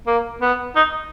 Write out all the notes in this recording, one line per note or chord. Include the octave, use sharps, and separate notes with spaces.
A#3
B3
D#4